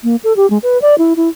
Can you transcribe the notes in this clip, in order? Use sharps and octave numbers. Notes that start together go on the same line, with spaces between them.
A#3
A4
G4
G#3
B4
D5
E4
E4